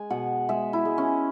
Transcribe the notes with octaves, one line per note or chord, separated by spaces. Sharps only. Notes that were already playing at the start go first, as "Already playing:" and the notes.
Already playing: G#3 G#5
B2 F#5
G#3 E5
E4
G#3
C#4